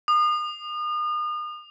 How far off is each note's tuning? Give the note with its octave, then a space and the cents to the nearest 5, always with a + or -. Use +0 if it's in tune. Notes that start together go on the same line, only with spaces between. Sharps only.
D#6 -40